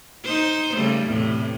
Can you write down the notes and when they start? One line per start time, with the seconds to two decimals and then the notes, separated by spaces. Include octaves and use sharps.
0.24 D#4 C5
0.76 C#3 G3 A3
1.05 E2 A2 C3